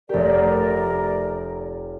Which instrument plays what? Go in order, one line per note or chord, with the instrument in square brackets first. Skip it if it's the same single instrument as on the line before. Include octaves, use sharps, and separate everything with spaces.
[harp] F1 G4 [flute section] A#4 D5